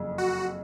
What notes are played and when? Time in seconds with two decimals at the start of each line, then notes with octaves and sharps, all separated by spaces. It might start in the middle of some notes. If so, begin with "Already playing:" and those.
Already playing: F#1 F2 C#3
0.18 F#4